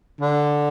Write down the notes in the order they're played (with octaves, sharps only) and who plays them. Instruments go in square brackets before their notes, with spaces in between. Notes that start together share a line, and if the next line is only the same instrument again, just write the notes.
[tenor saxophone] D3